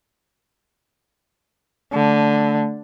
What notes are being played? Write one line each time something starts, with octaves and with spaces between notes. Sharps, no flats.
D3 A3